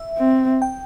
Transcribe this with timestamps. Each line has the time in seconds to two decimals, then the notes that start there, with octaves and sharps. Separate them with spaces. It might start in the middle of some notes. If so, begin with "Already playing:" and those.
Already playing: E5
0.18 C4
0.62 G5